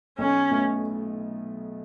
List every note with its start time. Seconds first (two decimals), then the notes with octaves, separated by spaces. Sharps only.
0.18 B1 C#4
0.50 B2 A3